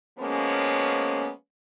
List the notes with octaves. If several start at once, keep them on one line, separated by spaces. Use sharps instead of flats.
F3 G#3 A#3 B3 C#4